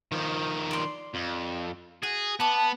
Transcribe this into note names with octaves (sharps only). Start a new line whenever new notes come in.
D#3 F3
D5 C6
F2
F#4 G#4
B3 A5 D6